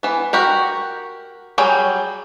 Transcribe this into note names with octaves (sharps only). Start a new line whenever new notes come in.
E3 B3
F#4 G4 A#4
F#3 G3 G#4 G5